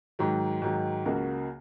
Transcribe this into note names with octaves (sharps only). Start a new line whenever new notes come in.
G#2 D#3 F#3
G#2 D#3 F#3
C#2 C#3 A#3 F#4